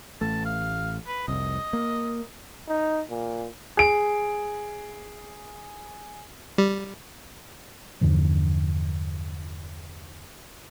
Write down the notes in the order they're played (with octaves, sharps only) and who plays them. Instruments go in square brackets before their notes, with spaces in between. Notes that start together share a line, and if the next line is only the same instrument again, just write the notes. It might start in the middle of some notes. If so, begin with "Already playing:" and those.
[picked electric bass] A1 A3 [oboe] A5
[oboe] F5
B4
[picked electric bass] F1 C2 [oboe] D#5
[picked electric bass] A#3
[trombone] D#4
A#2
[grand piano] G#4 D7
[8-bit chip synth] G3
[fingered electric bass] E2 G2 D3 F3